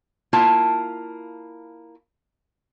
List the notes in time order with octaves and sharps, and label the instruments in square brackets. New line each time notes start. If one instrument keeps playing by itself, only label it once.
[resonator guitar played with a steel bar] A#3 E4 F4 F5 A5